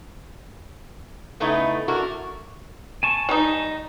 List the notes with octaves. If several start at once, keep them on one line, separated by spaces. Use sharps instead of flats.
C#3 A3 B3 D#4 E4
D4 E4 F#4 A4 A#4
G#5 A5 C#6
G3 D#4